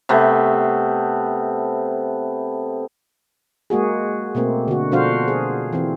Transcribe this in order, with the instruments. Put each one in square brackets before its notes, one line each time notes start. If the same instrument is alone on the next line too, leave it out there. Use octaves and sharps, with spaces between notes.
[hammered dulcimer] C3 A3 B3
[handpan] G#3 A#3 F#4 G#4
B2 A3 A#3 C4
D3 F#4
B2 F3 D4 F#4 C5 F5
G#4
E3 C4